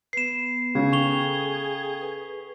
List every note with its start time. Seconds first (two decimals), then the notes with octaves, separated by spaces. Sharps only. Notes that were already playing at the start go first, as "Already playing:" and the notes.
0.13 B3 B4 C7 E7
0.75 C#3 G#4
0.93 A4 G5 C#6 F7 G7
2.02 B4